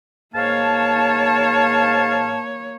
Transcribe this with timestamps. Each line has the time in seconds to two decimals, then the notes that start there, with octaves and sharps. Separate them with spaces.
0.35 G#2 A#3 C#5 F5 A5